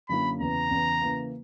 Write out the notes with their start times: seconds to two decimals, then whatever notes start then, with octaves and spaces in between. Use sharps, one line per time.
0.09 F#2 D3 A#3 C#4 E4 B5
0.40 E2 C#3 E3 B3 A#5
0.71 E2 C#3 E3 B3
1.02 C#3 E3 A#3